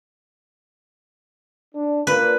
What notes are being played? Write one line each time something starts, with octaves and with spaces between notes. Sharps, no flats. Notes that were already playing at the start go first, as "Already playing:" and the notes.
D4
A#3 D4 F4 B4